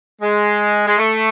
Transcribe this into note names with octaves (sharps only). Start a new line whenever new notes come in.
G#3
G#3
A3